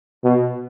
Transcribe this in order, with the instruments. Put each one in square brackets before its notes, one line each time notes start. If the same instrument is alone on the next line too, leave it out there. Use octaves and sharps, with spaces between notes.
[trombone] B2